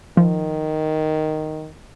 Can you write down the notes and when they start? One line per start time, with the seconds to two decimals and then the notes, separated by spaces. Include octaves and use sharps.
0.17 D#3 F3